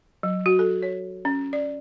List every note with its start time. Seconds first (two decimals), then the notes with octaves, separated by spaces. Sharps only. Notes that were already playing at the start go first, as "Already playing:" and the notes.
0.23 F#3
0.46 F#4
0.59 A4
0.82 C#5
1.25 C#4
1.53 D5